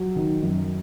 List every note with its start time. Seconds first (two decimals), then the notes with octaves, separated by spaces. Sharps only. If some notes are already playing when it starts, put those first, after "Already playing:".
Already playing: F#3
0.16 D#3
0.43 F#2